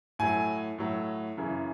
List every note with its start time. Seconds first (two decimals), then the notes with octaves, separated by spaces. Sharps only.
0.19 A2 F#3 G#5
0.78 A2 F#3
1.37 F#2 C#3 E3